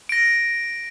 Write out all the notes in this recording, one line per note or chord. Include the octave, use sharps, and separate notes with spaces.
A#6 D7